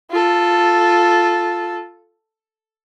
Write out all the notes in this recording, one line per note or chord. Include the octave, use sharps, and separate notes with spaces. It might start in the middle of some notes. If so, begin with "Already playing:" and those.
F4 A4